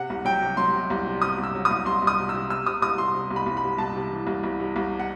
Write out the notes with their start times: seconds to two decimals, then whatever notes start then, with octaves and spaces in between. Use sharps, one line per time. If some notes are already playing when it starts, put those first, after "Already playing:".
Already playing: C3 F#5
0.10 C2
0.25 F#3 G5
0.42 C3
0.57 F#3 C6
0.73 C3
0.90 C2
1.06 C3
1.22 C3 D#6
1.38 C2
1.44 E6
1.54 F#3
1.65 D#6
1.71 C2
1.86 C2 C6
2.02 C2 D#6
2.18 C3
2.29 C3 E6
2.50 C3 E6
2.66 C3 D#6
2.82 C2 D#6
2.98 C2 C6
3.14 C3
3.31 C2
3.36 B5
3.46 C2
3.57 B5
3.63 C3
3.78 C2 A5
3.95 C3
4.10 E3
4.27 C2
4.43 C2
4.60 C3
4.76 C2
5.00 F#5